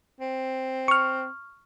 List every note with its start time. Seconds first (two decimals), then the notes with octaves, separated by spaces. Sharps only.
0.20 C4
0.88 C#6 F6